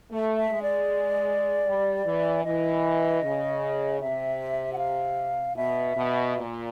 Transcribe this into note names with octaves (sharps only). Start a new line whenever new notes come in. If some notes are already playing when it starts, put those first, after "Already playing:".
A3
E5
G#3
D5
G3
E3
E3 D#5
C#3
C3 E5
F#5
F5
B2 E5
B2
A#2